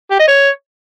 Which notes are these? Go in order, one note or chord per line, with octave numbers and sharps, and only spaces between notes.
G4
D#5
C#5